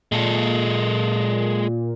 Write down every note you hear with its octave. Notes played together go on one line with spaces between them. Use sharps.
A#2 G#3 A4